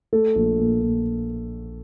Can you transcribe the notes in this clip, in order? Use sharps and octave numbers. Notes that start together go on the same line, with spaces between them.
A3 A4
A#1
A#2
A#1